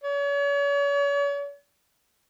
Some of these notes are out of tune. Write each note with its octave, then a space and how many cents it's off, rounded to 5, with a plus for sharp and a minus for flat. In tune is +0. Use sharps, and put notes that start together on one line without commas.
C#5 +40